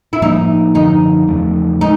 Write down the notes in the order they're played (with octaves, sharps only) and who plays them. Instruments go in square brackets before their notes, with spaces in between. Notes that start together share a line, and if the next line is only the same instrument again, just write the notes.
[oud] E4
[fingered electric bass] A2 F3 A#3 [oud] D#4
[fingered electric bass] F#2 D3 F3 [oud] D#4
[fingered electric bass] E2 C#3 F3 A3
[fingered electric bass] G#3 [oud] D#4